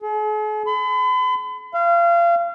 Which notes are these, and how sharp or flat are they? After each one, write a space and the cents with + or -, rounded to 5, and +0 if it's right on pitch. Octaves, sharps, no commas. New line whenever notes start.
G#4 +45
B5 +40
F5 -30